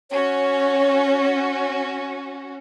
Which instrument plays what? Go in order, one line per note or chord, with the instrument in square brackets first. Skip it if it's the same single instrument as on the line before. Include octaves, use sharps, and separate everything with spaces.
[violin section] C#4 F#4 [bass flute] C#5